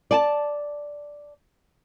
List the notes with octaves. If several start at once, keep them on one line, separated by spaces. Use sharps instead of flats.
D5 G#5 A5